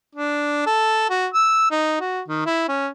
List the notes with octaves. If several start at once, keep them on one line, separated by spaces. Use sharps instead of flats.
D4
A4
F#4
E6
D#4
F#4
D#3
E4
C#4